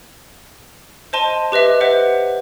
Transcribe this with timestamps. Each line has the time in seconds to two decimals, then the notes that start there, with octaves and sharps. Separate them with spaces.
1.13 C5 D#5 A5 C6 D#7
1.52 G4 B4 D#5 E5
1.81 B4 C5 E5 F#5